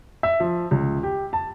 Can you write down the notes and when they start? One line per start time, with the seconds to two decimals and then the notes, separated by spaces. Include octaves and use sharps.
0.23 E5
0.40 F3
0.71 C#2
1.03 G4
1.33 A5